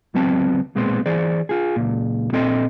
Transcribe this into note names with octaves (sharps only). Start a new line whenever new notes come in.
C#2 F#3 B3 C4 A5
B1 A#2 G#3 B3 C4 C6
E3 G#4 C5 D5
F4 G#4
C#2 A#2
A#2 C4 A4 D#5 C6